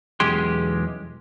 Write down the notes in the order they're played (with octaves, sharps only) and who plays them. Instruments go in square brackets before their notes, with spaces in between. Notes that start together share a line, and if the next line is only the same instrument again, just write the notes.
[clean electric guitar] B1 E2 G#3 C#4 G4 C6